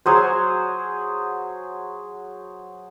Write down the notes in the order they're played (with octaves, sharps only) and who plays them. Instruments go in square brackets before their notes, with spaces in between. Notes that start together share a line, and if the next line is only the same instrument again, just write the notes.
[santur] F#3 G#4 C5